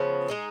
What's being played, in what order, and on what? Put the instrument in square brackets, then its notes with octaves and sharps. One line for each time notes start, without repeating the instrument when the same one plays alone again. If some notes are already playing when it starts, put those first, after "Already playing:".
Already playing: [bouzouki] C#3 F3 B3
G#3 D#4 G#4